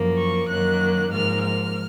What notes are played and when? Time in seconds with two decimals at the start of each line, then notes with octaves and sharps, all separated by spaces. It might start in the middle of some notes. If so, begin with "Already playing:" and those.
Already playing: F#2 F3 A#3
0.17 C#6
0.49 F#2 D#3 F#3 A#3 F#6
1.11 G#2 F3 A#3 F6
1.42 F6